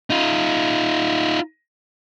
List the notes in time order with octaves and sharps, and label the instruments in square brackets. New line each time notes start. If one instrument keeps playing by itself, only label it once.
[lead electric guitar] D#4 F4